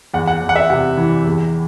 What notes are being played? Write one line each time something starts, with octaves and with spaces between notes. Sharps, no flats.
E2 F#5
F#5
E2
F#5
E5
C3 F#5
E3
E2